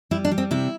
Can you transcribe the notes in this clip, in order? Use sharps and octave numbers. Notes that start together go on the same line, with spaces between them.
G3 E4
D4
G3
C4
C3 E4